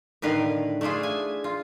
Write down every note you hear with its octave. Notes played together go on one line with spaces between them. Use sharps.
A2 D3 D#3 B4 F5
A3 D4 E4 F4 G#4
G#5
F4